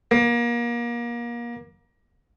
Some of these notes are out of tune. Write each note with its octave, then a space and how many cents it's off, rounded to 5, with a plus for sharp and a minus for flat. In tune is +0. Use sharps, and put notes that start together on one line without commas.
A#3 +30